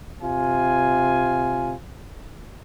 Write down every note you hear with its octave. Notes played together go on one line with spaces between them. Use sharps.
C3 F4 G#5